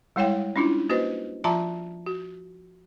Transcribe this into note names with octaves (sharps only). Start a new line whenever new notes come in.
G3 G#3 E4 C#5 F5 G5
C#4 D4 E4 F4
A#3 F#4 B4 C5 D#5
F3 F4 E5 A5 A#5 C6
F#4